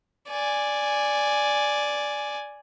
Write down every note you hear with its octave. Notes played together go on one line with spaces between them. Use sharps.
D5 G#5